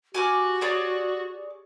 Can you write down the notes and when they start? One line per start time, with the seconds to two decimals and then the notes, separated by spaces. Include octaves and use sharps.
0.15 F#4 G4 G#5 D6 F6
0.61 G#4 C#5 D5